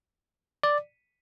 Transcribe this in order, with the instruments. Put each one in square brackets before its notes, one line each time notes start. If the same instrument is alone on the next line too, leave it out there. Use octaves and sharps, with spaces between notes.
[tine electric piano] D5